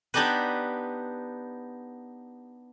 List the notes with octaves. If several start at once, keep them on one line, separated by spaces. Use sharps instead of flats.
B3 D4 D#4 G4 B4